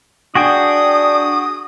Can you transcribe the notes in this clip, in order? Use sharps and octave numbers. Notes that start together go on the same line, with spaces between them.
D4 F#4 G#4 G5 D#6